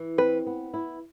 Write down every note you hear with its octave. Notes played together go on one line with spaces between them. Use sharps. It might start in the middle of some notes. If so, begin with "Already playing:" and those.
Already playing: E3
C4 B4
B3
E4